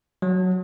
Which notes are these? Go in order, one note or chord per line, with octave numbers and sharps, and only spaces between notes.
F#3